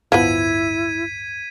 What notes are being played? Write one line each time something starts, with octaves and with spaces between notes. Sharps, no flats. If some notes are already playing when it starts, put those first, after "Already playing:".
D1 G1 F3 B3 E4 G#6 B6 D#7